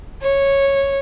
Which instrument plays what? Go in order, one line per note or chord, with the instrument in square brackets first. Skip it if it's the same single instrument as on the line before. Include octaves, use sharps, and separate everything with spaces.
[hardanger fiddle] C#5